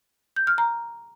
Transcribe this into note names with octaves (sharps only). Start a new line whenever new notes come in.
G6
F6
A#5